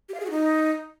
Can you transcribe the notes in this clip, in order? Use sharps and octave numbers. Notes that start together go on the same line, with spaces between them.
G4
F5
G#4
F#4
D#4